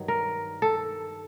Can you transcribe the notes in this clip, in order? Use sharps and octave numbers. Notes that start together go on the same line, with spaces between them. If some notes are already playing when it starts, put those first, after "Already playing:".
Already playing: G2 D#3 F#3
A#4
A4